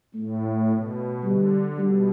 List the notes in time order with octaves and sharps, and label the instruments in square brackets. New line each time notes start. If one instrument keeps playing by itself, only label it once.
[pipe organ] A2 [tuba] A3
[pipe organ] B2
[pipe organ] D3 [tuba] G3
[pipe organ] B2 [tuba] G3